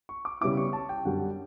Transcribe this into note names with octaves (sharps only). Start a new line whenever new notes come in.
C#6
D6
C#3 G3 B3 E4 D6
C#6
A5
G5
F#2 D3 G3 F#5